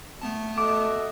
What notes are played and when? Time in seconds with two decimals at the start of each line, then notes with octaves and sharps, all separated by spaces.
0.21 A3 B3 A5
0.58 F#4 A4 D#5 E5 D6